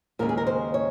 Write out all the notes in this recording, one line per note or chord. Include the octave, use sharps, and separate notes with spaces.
D#2 C#3 G#3 A#4
G#4
A#4
C5
C#5